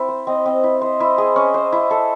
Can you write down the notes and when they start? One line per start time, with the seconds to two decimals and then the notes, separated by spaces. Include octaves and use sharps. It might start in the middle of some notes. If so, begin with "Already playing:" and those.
Already playing: C4 E4
0.08 C5
0.27 C4 D#5
0.46 C4
0.64 E4
0.82 C5 D#5
1.00 E4
1.18 G#4
1.36 C#4
1.54 C5
1.72 E4
1.91 A4